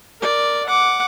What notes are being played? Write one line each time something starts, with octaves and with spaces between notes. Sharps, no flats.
A#4 D5
F#5 D6